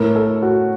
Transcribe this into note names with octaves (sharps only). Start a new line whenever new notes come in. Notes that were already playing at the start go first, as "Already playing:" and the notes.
Already playing: A2 A#4
A4
F#4